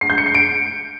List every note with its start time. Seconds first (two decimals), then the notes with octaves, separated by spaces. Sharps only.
0.01 C7
0.10 G6
0.18 C#7
0.26 C7
0.34 D7